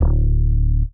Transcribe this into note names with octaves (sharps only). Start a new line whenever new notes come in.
D1